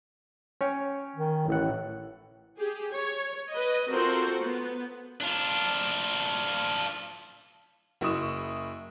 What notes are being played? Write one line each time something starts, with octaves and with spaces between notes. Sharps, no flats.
C#4 C#5 G5
D#3
A1 A2 F#5
G4 G#4
C#5
B4 D#5
C4 F4 F#4 A4 A#4 C5
B3
D4 F4
F#1 E4 C#6 D#6 E7